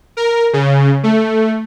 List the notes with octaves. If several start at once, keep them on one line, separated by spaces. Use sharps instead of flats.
A#4
C#3
A3